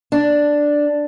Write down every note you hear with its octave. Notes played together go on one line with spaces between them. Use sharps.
D4